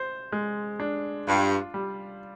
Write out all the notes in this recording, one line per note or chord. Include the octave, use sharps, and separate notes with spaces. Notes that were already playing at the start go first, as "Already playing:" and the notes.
Already playing: C5
G#3
D4
G2 F4
G3